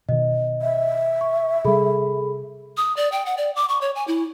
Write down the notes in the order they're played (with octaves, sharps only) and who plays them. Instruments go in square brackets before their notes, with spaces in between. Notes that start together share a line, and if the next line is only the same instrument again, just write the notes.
[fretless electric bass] B2 D#3 [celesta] D#5
[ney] E5
[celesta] C#6
[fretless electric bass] C3 G3 [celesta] G#4 A4 B5
[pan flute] D#6
D5
G5
F#5
D5
D6
C#6
C#5
G#5
E4